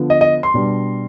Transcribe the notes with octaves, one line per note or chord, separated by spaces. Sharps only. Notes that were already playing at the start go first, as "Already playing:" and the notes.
Already playing: D3 F3 B3
D#5
D#5
C6
B2 G3 D4